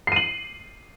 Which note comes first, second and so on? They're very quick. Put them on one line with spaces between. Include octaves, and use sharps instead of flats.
C7 D#7 F#7